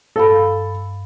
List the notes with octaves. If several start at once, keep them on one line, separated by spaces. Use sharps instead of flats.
G2 A4 F5 B5